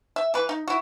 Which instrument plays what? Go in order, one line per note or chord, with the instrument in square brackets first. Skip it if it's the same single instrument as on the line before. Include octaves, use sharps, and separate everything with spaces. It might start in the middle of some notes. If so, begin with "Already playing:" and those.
[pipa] E5
E3 B4
D#4
E4 F#4